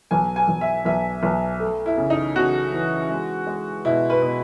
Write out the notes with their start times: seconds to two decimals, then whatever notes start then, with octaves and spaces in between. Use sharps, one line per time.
0.11 B1 G#5
0.36 G#5
0.48 B1
0.61 E5
0.85 B1 E5
1.23 B1
1.60 A3
1.86 E4
1.97 C#3
2.10 D#4
2.35 C#3 F#4
2.72 E3
3.10 G#3
3.47 G#3
3.85 B2 E4
4.10 B4
4.22 B2